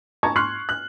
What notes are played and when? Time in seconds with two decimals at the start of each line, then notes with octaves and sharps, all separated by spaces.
0.23 A5 A#5 C#6 G#6
0.36 C6 C#6 F6 F#6 C7
0.69 F#6